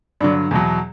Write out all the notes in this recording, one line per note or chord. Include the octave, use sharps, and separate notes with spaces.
G2 D3 F#3 D4
E2 B2 F#3